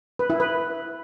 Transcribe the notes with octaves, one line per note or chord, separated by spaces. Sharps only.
B4
E4
B4